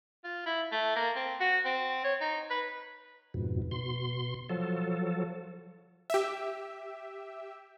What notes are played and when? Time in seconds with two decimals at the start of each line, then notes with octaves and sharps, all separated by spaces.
0.24 F4
0.46 E4
0.72 A3
0.96 A#3
1.16 C4
1.40 F#4
1.65 C4
2.04 C#5
2.21 D#4
2.50 B4
3.34 F2 G#2 B2
3.71 B2 C6
4.49 F3 F#3 A4
6.10 G4 E5